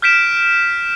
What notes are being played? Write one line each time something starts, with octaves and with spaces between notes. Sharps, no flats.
F6 G6 B6 D7 E7